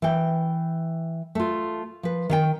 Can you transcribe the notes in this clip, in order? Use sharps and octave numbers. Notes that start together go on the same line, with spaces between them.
E3 G5
A3 F4
F3 B4
D#3 F5 G5